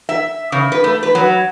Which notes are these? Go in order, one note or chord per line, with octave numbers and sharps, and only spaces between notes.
E5
C#3
B4
A3
B4
F#3